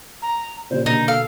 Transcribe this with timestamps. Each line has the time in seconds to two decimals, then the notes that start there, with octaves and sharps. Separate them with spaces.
0.22 A#5
0.70 A#2 C#3 G3 C5
0.86 B2 D3 A#3 D#4 A#5
1.08 A4 F5